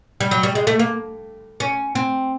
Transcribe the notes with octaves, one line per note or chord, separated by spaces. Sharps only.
G3
F#3
G3
G#3
A3
A#3
C#4
C4